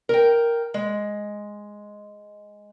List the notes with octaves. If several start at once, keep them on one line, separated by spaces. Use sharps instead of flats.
A#4 G5
G#3